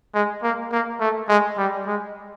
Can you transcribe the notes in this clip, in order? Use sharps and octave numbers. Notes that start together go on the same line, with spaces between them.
G#3
A#3
A#3
A3
G#3
G3
G#3